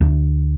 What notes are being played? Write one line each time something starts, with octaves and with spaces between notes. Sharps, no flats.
D2